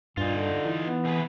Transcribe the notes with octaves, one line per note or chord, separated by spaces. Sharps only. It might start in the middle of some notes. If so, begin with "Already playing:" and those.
G2 A#2 D#4 F4
D3
E3
B3
C3 G#4 B4